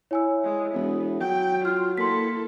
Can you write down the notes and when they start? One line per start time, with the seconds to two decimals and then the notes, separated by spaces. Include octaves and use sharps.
0.11 E4 C#5 G#5 E6
0.44 G#3
0.74 E1 B3
1.21 F#3 G5
1.65 F4 C6 F6
1.98 A#3 E4 A4 C6 B6